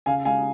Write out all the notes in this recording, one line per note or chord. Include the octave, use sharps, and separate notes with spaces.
C#3 F5 G#5
G#3 F5 G#5